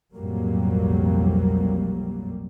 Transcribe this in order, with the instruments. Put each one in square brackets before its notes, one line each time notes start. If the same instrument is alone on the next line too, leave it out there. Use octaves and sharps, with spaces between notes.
[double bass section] B1 F2 A2 F#3 G3 A#3